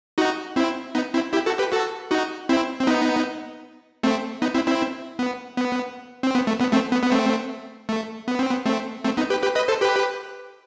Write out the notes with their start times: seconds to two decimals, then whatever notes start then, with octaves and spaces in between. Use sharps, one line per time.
0.18 D#4 F#4
0.56 C4 E4
0.95 B3 D#4
1.14 C4 E4
1.33 E4 G4
1.46 F#4 A4
1.59 G4 B4
1.72 F#4 A4
2.11 D#4 F#4
2.49 C4 E4
2.80 C4
2.87 B3 D#4
4.03 A3 C4
4.42 B3 D#4
4.54 C4 E4
4.67 C4 E4
5.19 B3
5.57 B3
6.23 C4
6.35 B3
6.47 A3
6.60 B3
6.73 A3 C4
6.92 B3
7.03 B3
7.12 A3 C4
7.89 A3
8.28 B3
8.39 C4
8.50 B3
8.66 A3 C4
9.04 A3 C4
9.17 B3 D#4
9.30 G4 B4
9.43 G4 B4
9.56 B4 D#5
9.68 A4 C5
9.81 G4 B4